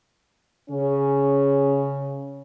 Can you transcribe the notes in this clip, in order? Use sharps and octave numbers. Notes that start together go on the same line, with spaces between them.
C#3 C#4